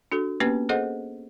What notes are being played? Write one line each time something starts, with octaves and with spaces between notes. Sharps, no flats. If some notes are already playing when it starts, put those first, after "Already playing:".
D4 F#4 A4
A#3 B3 C#4 G4 B4
G#4 A4 C5 D#5 F#5